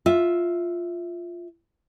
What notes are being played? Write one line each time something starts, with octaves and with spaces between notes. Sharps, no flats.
F4 E5